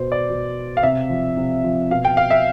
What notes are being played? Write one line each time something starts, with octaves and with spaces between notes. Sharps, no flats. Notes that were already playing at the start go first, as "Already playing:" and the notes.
Already playing: B2 C5
D5
B2
F5
C3 E5
F3
C3
F3
B2 F5
G5
F5
E5